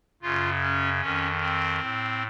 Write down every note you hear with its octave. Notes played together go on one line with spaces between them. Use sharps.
F#2 C#3 F4
C#4
F2 D#3 C#4
C4
A2